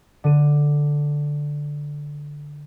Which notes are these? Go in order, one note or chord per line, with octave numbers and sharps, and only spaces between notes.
D3 D#7